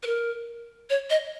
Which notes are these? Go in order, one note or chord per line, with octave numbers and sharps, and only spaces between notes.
B4
A#4
C#5
D#5